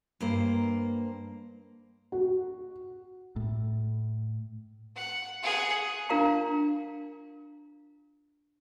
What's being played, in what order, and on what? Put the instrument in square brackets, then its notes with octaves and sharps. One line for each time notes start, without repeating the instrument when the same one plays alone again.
[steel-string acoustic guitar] G2 A#3 C5
[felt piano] F#4
[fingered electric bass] A2
[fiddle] F#5
G#4 F#5
[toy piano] D4 F4 A#4 F5 A#5 C#6